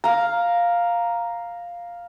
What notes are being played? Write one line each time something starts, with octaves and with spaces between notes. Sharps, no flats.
F5 A#5